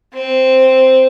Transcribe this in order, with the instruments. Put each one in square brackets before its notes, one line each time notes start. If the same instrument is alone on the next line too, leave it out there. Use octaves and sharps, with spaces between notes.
[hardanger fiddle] C4